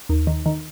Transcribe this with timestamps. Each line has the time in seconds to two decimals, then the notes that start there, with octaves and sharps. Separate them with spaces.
0.09 D#2
0.27 D#3
0.46 D#3